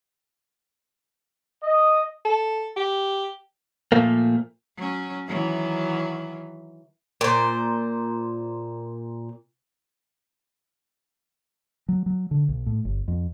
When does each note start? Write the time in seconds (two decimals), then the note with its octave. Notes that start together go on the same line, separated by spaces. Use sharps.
1.64 D#5
2.25 A4
2.77 G4
3.92 A#2 F3 A3 A#3
4.78 F#3 C#4
5.26 D#3 E3 F#3
7.21 A#2 C5
11.89 F#3
12.06 F#3
12.31 D3
12.49 B1
12.66 A2
12.85 G1
13.08 F2